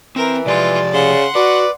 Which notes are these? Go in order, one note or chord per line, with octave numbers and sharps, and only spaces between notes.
E3 C4 A#4
C3 F3 G#3 F4 G4 D5
C#3 F#5 C6
F#4 B4 D5